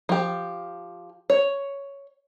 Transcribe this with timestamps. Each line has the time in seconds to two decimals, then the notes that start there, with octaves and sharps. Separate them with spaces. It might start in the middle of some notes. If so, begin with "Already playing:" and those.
0.09 F3 G4
1.30 C#5